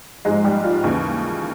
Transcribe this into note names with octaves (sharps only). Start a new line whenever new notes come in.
G#2 F3 G#3 G#4
G3 G4
F4
D#2 C#3 E3